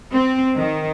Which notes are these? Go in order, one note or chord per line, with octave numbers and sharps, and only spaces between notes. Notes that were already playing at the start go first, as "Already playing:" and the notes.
C4
D#3